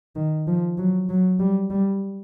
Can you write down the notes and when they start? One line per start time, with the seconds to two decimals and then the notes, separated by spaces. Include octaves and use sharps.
0.16 D#3
0.48 F3
0.78 F#3
1.10 F#3
1.40 G3
1.70 G3